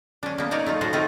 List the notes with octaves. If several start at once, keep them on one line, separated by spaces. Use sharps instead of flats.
C#4 D4
A#3 B3
D#4 A#4 C#5 D5
A3 D#4 F4
A2 F3 F#4 C5
A3 C4 D#4 F4